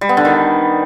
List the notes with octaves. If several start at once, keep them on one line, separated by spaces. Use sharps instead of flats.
G3
B3
D3
D#3